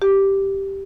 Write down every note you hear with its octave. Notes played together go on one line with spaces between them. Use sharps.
G4